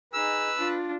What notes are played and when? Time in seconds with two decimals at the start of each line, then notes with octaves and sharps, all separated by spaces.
0.13 D#4 G#4 B4 E6
0.57 D4 F4